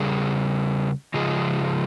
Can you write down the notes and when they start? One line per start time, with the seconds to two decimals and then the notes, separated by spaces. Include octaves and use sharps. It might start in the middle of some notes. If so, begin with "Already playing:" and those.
Already playing: C#3 G3 G#4
1.14 C#3 F3 G#3 G#4